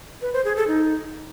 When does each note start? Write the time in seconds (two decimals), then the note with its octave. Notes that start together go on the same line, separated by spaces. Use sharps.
0.22 B4
0.33 C5
0.45 G#4
0.56 A4
0.68 D#4